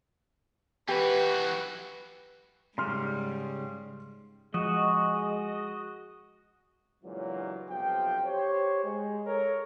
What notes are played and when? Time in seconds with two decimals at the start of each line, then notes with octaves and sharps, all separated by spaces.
0.88 E3 F#4 G4 B4
2.78 G#2 C#3 G3 C6 F6
4.54 F3 G#3 F#4 D#5
7.04 C#2 G2 A#2 E3 F#3
7.69 B1 C3 F3 G5
8.25 G4 C5 C#5
8.84 G#3
9.25 A4 A#4 C#5